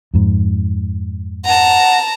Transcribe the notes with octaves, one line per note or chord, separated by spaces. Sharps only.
F2 G#2
F#5 A5 A#5